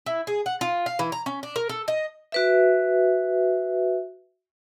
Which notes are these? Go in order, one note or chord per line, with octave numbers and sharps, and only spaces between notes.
E4
G#4
F#5
F4
F5
E3
A#5
C#4
D4
A#4
A4
D#5
F#4 B4 E5